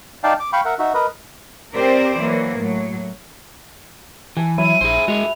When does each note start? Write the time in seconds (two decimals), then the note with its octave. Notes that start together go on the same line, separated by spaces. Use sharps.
0.24 D#4 D5 F5 G5 A5
0.40 D6
0.53 F5 G5 B5 C#6
0.65 A#4 E5 F#5
0.79 D#4 F#4 E5
0.94 A#4 B4 D#5
1.75 C4 G4 A#4 C5 D5
2.17 E3 F#3 A#3
2.59 A2 F#3
4.37 E3 G#5 A5
4.58 F#3 E4 E5 D#7
4.81 A#1 G#4 C5
5.08 G#3 F#4 G#4 F7